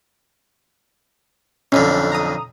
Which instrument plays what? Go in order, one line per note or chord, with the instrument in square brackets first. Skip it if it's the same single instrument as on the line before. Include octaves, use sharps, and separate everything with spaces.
[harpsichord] B1 F2 D3 [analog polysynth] C#4
[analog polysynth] A#5 D#6